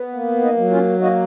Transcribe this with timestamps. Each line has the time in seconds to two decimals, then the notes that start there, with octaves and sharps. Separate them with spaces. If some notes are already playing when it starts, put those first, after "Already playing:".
Already playing: B3
0.13 A#3
0.42 D#4
0.56 F#3
0.70 C#4 F4
0.99 A#3 D#4 F#4